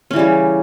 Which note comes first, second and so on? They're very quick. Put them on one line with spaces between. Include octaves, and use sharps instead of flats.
C#4 E3 G3 C#3